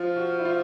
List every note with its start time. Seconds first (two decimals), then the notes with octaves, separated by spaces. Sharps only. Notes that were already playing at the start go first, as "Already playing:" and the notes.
Already playing: F3 F4
0.16 F#4
0.39 E4
0.45 F4